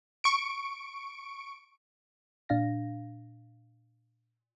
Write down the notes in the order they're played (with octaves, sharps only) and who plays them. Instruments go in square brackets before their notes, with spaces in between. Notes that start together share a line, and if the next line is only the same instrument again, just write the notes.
[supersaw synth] C#6 D7
[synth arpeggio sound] A#2 D4 F5 A#6